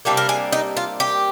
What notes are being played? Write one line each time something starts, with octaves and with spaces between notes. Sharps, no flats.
C3 G3 A#3 D4 G4
A#4
G#4
D#4
F4
G4